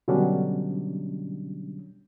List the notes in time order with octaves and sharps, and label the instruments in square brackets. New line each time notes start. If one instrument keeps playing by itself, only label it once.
[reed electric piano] B2 D3 F#3 G3 C#4 D4